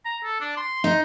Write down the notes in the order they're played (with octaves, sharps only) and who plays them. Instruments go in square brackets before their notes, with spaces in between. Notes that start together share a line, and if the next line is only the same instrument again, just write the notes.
[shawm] A#5
A4
D4
C6
[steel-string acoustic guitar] D#4